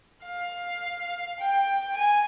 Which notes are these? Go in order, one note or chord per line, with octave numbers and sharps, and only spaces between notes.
F5
G5
G#5